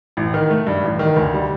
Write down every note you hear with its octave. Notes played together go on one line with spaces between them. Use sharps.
A1
D#3
A3
G2
A1
D#3
D2
G3